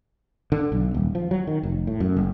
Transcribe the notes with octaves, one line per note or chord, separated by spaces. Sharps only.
D3
B1
D#1
F3
F#3
D#3
F1
A2
F#2
F#1